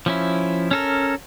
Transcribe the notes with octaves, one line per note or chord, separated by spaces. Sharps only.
F3 C#4 E4
C#4 A4 A#4